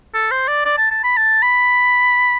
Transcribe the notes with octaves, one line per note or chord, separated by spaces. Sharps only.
A4
C5
D5
D5
A5
A5
B5
A5
B5